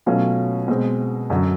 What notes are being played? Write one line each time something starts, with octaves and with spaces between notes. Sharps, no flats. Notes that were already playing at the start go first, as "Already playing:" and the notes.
B2 F#3 A3 C#4 F4
B2 G#3 C4
F#2 D3 F#3